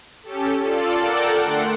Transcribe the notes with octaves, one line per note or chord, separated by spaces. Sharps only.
C#4 G4 A4
F4 A4 D5
A4 A#4 D5 F#5 G5 A5
D3 A3 F#5 C6 D7